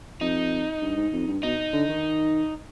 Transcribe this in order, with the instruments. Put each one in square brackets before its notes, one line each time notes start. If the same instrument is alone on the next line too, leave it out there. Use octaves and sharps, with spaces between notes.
[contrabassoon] F2 [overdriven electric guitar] D#4
[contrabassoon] G2
G#2
F2
G2
[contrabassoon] B2 [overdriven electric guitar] D#4
[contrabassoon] D3
D#3